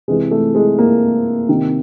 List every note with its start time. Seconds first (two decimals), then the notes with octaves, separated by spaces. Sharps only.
0.08 C3 E3 G#3
0.31 A3
0.55 G#3
0.79 A#3
1.49 C3 D#3